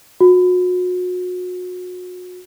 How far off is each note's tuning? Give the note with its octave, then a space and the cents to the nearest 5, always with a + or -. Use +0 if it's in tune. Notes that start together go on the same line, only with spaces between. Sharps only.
F#4 -35